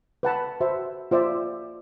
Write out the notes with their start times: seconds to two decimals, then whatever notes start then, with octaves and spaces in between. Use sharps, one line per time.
0.23 B4 F#5 A5 B5
0.60 F#4 C5 E5
1.11 F4 C5 D5 E5